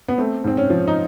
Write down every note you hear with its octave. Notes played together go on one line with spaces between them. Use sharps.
B3
A3 C4
G#2 C4
C#4
F3
D#4